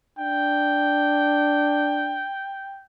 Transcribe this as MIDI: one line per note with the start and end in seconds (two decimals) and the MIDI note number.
0.18 2.27 62
0.18 2.86 79